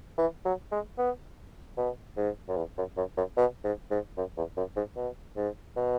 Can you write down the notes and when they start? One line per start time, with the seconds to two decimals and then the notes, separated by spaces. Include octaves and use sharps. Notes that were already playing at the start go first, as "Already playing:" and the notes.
0.18 E3
0.45 F#3
0.72 G#3
0.98 B3
1.77 B2
2.17 G#2
2.48 F#2
2.57 E2
2.77 F#2
2.97 F#2
3.17 F#2
3.37 B2
3.64 G#2
3.91 G#2
4.17 F#2
4.37 E2
4.57 F#2
4.76 G#2
4.96 B2
5.36 G#2
5.76 B2